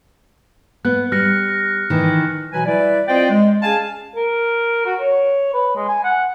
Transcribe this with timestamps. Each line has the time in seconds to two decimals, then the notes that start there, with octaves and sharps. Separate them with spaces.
0.85 B3 F#6
1.12 G3 F6 A#6 C#7
1.90 D#3 E3
2.53 B2 E3 F#3 B4 G#5
2.66 G3 E4 B4 D5
3.08 C4 F4 C5 D5 D#5 G5
3.30 G#3
3.63 C#4 G#4 F5 G#5 A5
4.16 A#4
4.86 F#4
5.00 C#5
5.54 B4
5.76 G#3
5.88 G#5
6.04 F#5